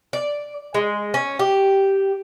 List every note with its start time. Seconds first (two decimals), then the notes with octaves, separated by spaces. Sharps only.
0.13 D5
0.74 G#3
1.14 C#4
1.39 G4